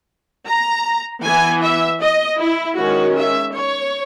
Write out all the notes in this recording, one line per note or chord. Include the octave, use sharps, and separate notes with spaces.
A#5
E3 B3 G#5
E5
D#5
E4
D#3 G#3 C#4 F#4
E5
C#5